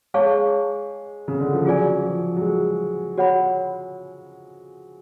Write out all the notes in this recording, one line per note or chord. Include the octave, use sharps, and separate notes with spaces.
G#3 G#4 C#5 F5 A5 C#6
C#3
D3
F3
F#3 F4 G#4 D5 G#5
F3
F#3
G#3
F#4 C#5 F#5 B5